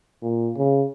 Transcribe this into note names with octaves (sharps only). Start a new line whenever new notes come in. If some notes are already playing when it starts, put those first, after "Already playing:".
A#2
C#3